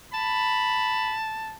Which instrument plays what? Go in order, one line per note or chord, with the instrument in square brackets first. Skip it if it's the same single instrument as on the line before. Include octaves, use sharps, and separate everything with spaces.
[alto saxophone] A5 [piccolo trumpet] B5